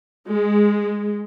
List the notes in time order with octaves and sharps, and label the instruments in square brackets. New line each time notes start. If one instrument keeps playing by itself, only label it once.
[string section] G#3